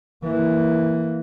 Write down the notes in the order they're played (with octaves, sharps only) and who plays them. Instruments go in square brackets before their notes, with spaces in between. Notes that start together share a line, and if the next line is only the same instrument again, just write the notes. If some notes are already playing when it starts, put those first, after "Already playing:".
[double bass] E3 A#3